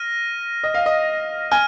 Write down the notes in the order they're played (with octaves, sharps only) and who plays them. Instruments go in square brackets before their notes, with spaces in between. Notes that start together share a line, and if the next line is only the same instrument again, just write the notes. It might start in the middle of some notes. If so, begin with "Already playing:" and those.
Already playing: [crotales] F6 A#6 D#7
[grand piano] D#5
F5
D#5
[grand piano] G#5 [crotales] F6